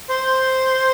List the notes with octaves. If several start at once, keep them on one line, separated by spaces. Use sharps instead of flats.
C5